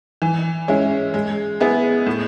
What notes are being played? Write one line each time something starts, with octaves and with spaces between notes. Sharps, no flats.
E3
G#3 C#4 E4
G#3
B3 E4 G#4
A2